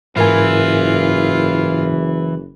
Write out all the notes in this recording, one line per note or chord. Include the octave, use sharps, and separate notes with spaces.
F#1 G#2 E3 E4 F4 A#4 G#5